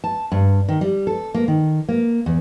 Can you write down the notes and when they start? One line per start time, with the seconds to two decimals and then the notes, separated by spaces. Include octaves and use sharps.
0.04 A5
0.32 G2
0.69 D#3
0.81 G3
1.07 A4
1.34 A#3
1.48 D#3
1.89 A#3
2.26 E2